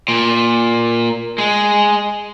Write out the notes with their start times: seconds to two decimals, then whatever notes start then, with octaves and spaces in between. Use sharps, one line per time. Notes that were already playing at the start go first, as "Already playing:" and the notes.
0.08 A#2
1.38 G#3